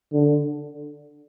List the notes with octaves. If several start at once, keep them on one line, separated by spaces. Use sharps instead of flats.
D3